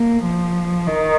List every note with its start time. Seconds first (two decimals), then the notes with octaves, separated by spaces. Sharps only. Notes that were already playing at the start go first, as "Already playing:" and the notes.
Already playing: A#3
0.23 F3
0.87 D#3